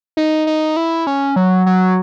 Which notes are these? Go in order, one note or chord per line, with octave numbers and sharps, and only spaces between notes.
D#4
D#4
E4
C#4
F#3
F#3